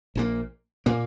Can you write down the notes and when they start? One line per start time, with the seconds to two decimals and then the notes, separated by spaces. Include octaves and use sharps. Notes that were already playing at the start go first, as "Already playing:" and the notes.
0.15 A#1 A#2 A#3
0.86 A#2 A#3